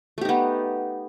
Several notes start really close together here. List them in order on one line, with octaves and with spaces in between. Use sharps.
A3 G4 D#4 B3